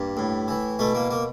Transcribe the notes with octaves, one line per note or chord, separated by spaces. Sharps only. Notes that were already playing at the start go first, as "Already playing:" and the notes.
Already playing: G2 A#3
A2
E3
B2 A3
A#3
A#3